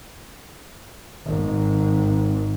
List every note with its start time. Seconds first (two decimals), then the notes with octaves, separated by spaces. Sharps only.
1.25 G#1